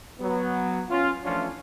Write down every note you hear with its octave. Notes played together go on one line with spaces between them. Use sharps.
F#3 B3
C#4 F4
E3 F3 A3 C#4 D4 F4